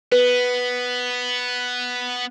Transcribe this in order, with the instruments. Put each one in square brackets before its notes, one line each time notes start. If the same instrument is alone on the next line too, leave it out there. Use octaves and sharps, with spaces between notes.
[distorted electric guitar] B3 [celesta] B4